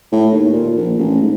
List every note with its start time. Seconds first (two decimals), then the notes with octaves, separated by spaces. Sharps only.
0.12 A2
0.32 D#2
0.53 A#2
0.76 A#1
0.99 A1
1.22 G#2